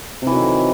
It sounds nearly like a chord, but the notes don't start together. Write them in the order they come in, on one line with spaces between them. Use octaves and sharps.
C3 E3 F#3 D#3